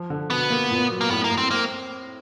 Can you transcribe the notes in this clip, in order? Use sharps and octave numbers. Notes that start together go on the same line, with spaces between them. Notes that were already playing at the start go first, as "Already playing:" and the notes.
Already playing: F3
D3
B2 B3
A#3
A#2
F#3
A#3
A2 B3
A#3
A2
C4
A#3 C4